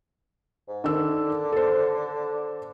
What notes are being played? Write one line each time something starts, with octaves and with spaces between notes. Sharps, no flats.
G#2
D3 D#3 E6
A4 C5